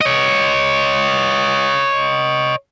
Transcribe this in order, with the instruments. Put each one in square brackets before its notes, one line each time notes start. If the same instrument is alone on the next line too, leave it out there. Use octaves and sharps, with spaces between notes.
[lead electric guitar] C#5 D#5